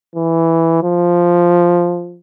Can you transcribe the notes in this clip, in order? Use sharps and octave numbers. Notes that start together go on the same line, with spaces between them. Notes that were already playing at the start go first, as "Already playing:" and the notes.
E3
F3